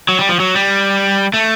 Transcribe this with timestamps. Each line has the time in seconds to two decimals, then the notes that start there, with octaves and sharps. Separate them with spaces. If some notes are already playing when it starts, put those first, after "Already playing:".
0.09 F#3
0.19 G3
0.29 F3
0.40 F#3
0.55 G3
1.34 A3